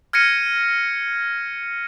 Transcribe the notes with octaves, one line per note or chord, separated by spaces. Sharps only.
F6 G#6 A#6 C#7 D#7